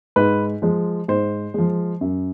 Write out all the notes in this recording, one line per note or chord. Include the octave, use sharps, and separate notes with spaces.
G#2 B4
F3 G#3
G#2 C5
F3 G#3
F#2